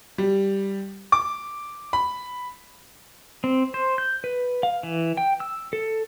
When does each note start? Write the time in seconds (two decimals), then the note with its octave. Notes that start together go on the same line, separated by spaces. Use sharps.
0.18 G3
1.12 D6
1.93 B5
3.44 C4
3.74 C5
3.98 G6
4.24 B4
4.63 F5
4.83 E3
5.17 G5
5.40 E6
5.73 A4